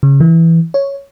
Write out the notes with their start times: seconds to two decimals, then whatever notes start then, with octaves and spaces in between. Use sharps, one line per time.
0.03 C#3
0.20 E3
0.74 C#5